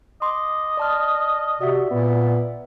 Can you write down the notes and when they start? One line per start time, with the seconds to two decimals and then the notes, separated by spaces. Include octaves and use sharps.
0.22 D#5 C6 D6
0.77 D5 A5 F6
1.61 C3 F#4 D5 E5
1.91 A#2 B3